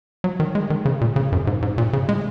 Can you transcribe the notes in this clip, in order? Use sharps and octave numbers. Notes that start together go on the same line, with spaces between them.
F#3
D#3
G#3
D#3
C#3
A#2
C#3
F#2
G#2
G#2
A#2
C#3
G#3